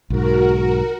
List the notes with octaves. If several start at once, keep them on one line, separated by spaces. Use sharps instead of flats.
B1 G#2 F#4 A#4